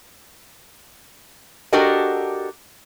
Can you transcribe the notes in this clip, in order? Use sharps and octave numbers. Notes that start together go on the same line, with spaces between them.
D4 F#4 G4 A4 A#4 D#5